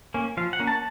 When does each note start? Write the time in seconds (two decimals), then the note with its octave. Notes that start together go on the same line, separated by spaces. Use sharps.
0.14 A#3 C#4
0.37 F3 F5
0.53 F#5
0.59 A#3 C#4
0.67 A5